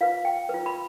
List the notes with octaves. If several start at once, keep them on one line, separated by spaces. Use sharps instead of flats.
F4 B4 F5
G5
F4 B4
B5